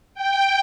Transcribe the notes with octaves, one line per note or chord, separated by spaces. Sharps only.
G5